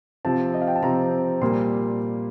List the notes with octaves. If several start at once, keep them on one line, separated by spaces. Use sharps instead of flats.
C3 F3 C4 A5
D#5
F5
G5
A5
C3 F3 C4 A#5
A#2 G3 A#3 C6